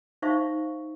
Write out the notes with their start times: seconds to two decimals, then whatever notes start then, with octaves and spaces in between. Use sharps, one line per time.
0.22 D#4 C5 E5 F5 C#6